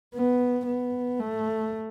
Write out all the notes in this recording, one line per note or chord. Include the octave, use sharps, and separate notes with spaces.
B3
B3
A3